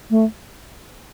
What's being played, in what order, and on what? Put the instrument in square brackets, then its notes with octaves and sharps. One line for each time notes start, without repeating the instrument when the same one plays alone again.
[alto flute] A3